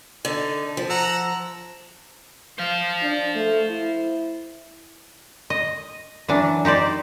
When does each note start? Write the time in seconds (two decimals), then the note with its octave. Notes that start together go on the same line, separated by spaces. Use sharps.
0.25 D3 D#4
0.77 F3
0.90 F#5 A#5 E6
2.58 C5 F5
3.02 D4
3.35 A3
3.70 E4
5.50 D#5
6.28 E3 F#3 D4
6.65 D#4 G4 C5 D5